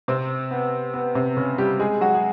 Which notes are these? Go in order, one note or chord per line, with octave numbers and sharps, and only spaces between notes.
C3 C4
B3
B3
C3 C4
C#3 C#4
G3 G4
G#3 G#4
F#3 F#4
G#4